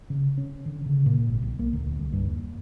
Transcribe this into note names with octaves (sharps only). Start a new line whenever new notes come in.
C#3
C#4
D3
C#3
A#2
G#1
B1
A#3
D2
C2
G2
D#2